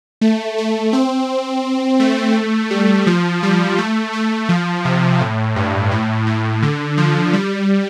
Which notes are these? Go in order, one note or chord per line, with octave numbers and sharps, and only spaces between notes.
A3
A3
C4
A3
G3
F3
G3
A3
A3
F3
C3
A2
G2
A2
A2
D3
F3
G3